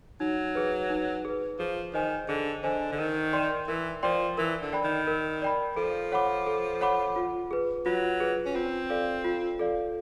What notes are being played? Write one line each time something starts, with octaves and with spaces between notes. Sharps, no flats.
F#3 D#4
G#4 B4
D#4
G#4 B4
F3 G#4
D#3 C5 D#5 G#5
D3 G#4
D3 C5 D#5 G#5
D3
D#3 A#4
D5 G5 C6
E3 A#4
F3 D5 G5 C6
E3 A#4
D3
D5 G5 B5
D#3
A#4
D5 G5 B5
F3 A4
C#5 F#5 B5 D6
A4
C#5 F#5 B5 D6
F4
G#4 B4
F#3 F4
G#4 B4
C#4
C4 F4
A4 D5 F5
F4
A4 D5 F5